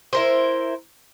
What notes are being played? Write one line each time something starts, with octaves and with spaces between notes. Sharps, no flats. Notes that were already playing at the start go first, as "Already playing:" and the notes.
E4 A#4 C5